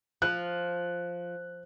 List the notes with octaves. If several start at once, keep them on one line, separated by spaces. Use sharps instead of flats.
F3 F#6